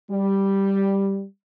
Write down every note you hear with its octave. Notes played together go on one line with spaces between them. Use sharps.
G3